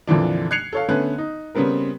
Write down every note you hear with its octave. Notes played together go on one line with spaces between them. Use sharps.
F2 A#2 D3 E3 D4
F#6 G#6 C7 C#7 F7
A4 C#5 F5
D3 A3 B3 C#4 F#6
D#4
C#3 G3 B3 C4 A#4